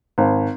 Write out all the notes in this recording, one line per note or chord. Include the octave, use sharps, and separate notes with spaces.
G#1